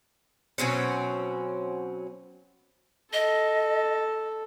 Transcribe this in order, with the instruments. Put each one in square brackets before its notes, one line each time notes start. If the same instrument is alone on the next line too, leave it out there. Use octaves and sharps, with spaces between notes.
[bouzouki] B2 F#3 C4 C#4
[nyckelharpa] A4 [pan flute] D#5